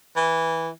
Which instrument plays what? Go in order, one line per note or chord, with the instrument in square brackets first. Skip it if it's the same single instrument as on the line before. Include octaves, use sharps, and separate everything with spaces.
[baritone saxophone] E3